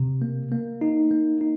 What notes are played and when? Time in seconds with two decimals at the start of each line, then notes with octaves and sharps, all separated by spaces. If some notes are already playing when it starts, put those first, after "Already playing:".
Already playing: C3
0.22 A#3
0.52 A#3
0.81 D#4
1.11 A#3
1.41 D#4